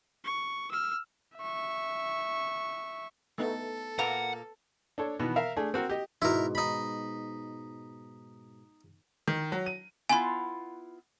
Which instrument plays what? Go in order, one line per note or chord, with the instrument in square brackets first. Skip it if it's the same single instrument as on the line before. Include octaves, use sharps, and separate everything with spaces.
[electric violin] C#6
E6 F6
E5 C#6
[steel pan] A3 B3 D#4 [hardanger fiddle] A4
[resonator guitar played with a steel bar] A#2 A#3 A#5 [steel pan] B4 [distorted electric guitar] F#5
[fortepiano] D4 A4 C#5
B2 D#3 E3 B3
A#4 E5 F5
A3 D4 G#4
C4 F#4 A#4
G4 D#5
[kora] G#2 B2 [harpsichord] E4 A#4
[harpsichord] D#4 B5
[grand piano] D#3
F#3
D#7
[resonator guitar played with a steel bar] B3 E4 F4 [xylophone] G#5 C6